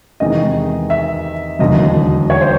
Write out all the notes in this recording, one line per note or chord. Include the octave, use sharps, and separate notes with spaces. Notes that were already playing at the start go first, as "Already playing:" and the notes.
E2 C3 D#3 G#3 D#5
E5
E1 D#2 D3 F#3 D#5
C#5
C5